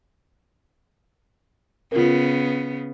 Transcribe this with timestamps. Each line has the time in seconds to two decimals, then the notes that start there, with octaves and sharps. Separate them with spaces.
1.92 C#3 B3 F4 A#4